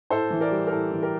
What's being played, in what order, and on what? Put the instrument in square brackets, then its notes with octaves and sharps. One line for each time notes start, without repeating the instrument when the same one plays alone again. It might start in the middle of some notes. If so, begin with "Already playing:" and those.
[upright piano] A2 A4 C5
E3
A#4 D5
G3
A#4
A2 A4
E3
G4 A#4